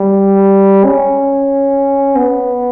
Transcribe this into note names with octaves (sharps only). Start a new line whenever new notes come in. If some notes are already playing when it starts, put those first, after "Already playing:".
Already playing: G3
C#4
B3